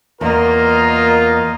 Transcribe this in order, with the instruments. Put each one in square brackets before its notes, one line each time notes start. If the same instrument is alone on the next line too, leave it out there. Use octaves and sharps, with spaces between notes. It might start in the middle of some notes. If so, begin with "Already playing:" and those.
[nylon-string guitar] E2 [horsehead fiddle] A#3 D#5 [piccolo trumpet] F4 [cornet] A#4